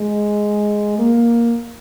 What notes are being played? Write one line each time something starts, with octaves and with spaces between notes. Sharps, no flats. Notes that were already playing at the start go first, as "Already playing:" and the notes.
Already playing: G#3
A#3